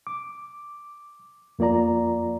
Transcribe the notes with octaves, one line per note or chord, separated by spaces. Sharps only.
D6
F2 A#3 F4 D5 A#5